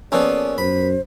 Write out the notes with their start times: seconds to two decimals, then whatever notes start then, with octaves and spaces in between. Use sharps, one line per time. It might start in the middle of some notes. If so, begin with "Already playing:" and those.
0.12 F3 A#3 B3 C#4 G#4 A4 D5
0.58 F#2 C5 B5